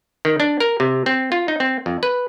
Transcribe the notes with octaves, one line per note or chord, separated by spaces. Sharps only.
D#3
D4
A#4
C3
C4
F4
D#4
C4
F2
B4